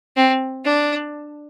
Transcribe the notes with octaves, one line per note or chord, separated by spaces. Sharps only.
C4
D4